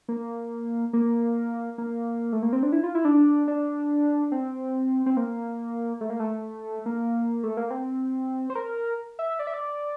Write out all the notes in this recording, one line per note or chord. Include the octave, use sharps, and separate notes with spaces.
A#3
A#3
A#3
A3
A#3
C4
D4
E4
F4
E4
D4
D4
C4
C4
A#3
A3
A#3
A3
A#3
A3
A#3
C4
C5
A#4
E5
D5
E5
D5